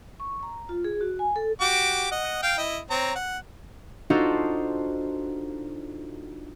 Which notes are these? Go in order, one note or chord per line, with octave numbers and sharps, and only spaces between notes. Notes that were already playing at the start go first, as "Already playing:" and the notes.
C#6
A#5
F4
G#4
F#4
G#5
A4
F#4 G4 D6
D#5 F#5
F5 G5
E4 D#5
C4 C#5 A#5
F#5
D4 D#4 F4 F#4 A4 C5